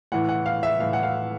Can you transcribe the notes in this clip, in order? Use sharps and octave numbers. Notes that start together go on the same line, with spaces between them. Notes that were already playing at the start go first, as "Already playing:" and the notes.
A2 E3 F#5
F#5
F5
E5
A2 E3 F5
F#5
F5